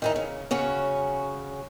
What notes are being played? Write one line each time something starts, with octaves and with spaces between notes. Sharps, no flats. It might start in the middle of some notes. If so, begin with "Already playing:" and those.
D#3 E3 D#4
C#3
C#3 C#4 F#4